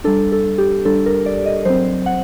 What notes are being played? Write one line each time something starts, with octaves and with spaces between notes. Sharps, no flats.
G3 D4 A4
A4
G4
G3 D4 A4
A#4
D5
D#5
F#3 C4 C5
F#5